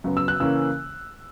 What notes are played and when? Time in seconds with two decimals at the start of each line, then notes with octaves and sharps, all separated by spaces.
0.04 F#2 C#3 F#3 B3
0.17 E6
0.28 F#6
0.40 C#3 E3 A#3 C#4 E6